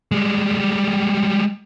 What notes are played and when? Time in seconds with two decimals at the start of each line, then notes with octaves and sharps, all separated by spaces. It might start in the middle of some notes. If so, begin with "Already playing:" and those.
0.12 G3 G#3